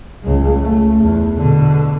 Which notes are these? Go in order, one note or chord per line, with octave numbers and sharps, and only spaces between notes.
C#2 G#3
A3
E2
B2 D3